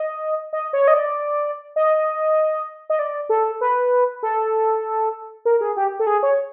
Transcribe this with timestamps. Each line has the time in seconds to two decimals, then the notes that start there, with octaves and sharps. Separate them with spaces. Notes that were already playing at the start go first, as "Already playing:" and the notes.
Already playing: D#5
0.53 D#5
0.73 C#5
0.88 D#5
0.94 D5
1.76 D#5
2.90 D#5
2.99 D5
3.29 A4
3.61 B4
4.23 A4
5.45 A#4
5.61 G#4
5.77 G4
5.99 A4
6.07 G#4
6.23 C#5